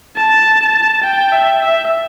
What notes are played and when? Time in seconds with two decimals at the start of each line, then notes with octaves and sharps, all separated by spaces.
0.17 A5
1.04 G5
1.32 E5
1.61 E5